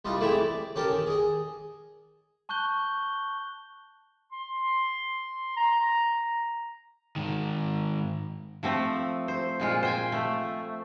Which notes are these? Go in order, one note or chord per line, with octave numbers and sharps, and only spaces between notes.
C2 G3 F4 D#5
C3 E3 A3 E4 G4 G#4
D5
C#4 G4 A4 A#4
D#3
G#4 D#5
A5 C#6 F#6 G6 G7
C6
A#5
G#2 D#3
F3 A3 C4
C5
A#2 G#3 F4
C5 G5 G#5
A3